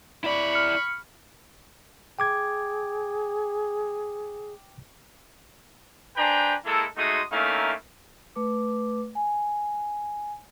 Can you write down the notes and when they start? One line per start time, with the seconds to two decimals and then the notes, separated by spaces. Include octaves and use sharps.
0.24 E4 D5 B5 C#6
0.53 F6 C#7
2.19 G#4 G5 D6 G#6
6.17 D4 B4 C5 G5 G#5 A#5
6.66 G#3 A#3 E4 A4
6.97 G#3 A3 D#4 F#4 C6 D#6
7.32 A3 A#3 C#4 D#4 E4 F5
8.36 A3 B4 D6
9.15 G#5